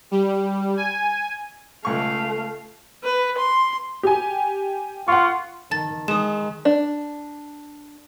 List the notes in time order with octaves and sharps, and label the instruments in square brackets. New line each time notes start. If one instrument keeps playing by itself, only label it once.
[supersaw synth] G3
G#5
[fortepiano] C#2 C#6 [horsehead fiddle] A3 F5
[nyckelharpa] B4
C6
[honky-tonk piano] G4 G#5
[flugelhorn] F4 [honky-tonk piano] F#5 C6 C#6
[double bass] D#3 [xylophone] A5 A6
[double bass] D#3 [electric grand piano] G#3 [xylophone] D#6 E7
[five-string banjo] D4